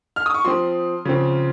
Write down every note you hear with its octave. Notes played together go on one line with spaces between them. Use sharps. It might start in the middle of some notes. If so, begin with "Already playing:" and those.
F6
D#6
C#6
F3 C4 C6
C#3 F3 C4